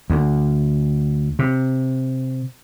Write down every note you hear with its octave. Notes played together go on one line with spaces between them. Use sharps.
D2
C3